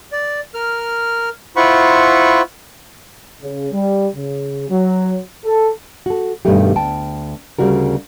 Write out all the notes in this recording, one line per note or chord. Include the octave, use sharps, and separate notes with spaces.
D5
A#4 F6
E4 F4 C5 F#5 B5 C#6
C#3
G3
C#3
F#3
A4
F#4 A4
G2 B2 D#3 G3 A3 G4
D2 G5 A5
D2 C#3 G3 F#4 A#4